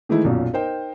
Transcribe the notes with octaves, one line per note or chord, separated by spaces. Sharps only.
D#3 E3 G#3 A3 D#4 E4
B1 F#2 A#2
D#4 A#4 C5 G5